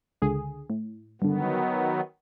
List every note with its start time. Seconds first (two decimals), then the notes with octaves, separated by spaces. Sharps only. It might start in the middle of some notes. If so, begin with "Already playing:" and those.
0.22 C#2 D3 G#4
0.70 A2
1.22 G2 D3 D#3 F#3 B3